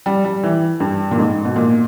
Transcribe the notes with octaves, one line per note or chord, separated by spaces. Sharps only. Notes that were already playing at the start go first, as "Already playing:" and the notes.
G3
G3
E3
G2
A#2
G#2
B2
A#2